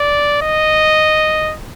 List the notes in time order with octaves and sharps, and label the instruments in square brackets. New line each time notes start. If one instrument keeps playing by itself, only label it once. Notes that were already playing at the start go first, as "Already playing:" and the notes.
Already playing: [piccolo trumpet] D5
D#5